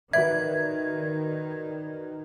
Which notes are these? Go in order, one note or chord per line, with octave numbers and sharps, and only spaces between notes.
D#3 F#4 B4 D5 E5 G#6